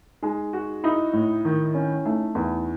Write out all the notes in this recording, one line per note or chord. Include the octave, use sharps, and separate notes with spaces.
G#3 D#4
F#4
D#4 E4
A2
D#3
C#4
A3 D#4
E2 B3